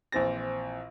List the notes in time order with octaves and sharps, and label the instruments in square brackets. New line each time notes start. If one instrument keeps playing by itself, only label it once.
[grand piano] A#1 E3 C4 A6 A#6